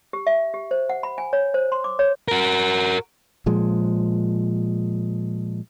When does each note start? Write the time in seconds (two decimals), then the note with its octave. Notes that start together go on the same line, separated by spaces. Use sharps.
0.13 G4
0.27 E5
0.54 G4
0.71 C5
0.89 F#5
1.03 B5
1.18 G#5
1.33 C#5
1.54 C5
1.72 C6
1.84 D6
1.99 C#5
2.28 F#4 A#4
3.46 A#2 F3 G#3